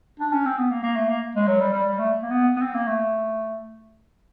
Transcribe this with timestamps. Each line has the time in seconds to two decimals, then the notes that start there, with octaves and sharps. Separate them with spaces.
0.19 D4
0.33 C#4
0.45 C4
0.59 B3
0.71 A#3
0.83 A#3
0.96 A3
1.09 A#3
1.35 G#3
1.47 F#3
1.60 G3
1.72 G3
1.86 G3
1.98 A3
2.22 A#3
2.31 B3
2.56 B3
2.62 C4
2.75 A#3
2.87 A3